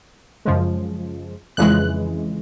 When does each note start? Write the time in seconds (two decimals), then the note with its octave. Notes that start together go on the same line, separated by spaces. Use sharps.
0.45 F#2 C#3 F3 G#3
1.57 F2 C#3 E3 G#3 F#6